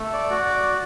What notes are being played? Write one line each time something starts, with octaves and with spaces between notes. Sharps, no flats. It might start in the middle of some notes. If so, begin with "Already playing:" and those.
Already playing: A3
D5
F#4
D5